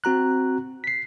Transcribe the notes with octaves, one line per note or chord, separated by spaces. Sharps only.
C4 F#4 A#5 F#6
B6 C7